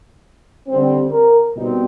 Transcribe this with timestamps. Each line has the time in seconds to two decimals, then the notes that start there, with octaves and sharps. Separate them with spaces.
0.68 D3 G3 C4
1.12 A#4
1.55 B2 G3 C4 D#4